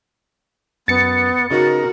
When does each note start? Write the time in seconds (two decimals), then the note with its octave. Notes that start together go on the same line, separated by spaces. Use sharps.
0.88 F#2 B3 A6 C#7
1.51 C#3 D#4 F#4 A#4